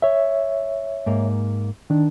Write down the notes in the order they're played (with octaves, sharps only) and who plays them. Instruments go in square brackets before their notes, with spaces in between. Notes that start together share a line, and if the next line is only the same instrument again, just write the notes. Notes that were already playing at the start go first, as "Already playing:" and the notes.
[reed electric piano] C#5 E5
[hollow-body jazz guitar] G#2 A#3
[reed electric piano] D#3 D4